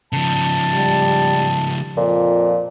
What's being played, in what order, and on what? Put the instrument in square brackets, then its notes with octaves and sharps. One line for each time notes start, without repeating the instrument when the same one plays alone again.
[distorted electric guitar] C#3 F3 [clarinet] A5
[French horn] G3
[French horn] F2 [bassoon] A#2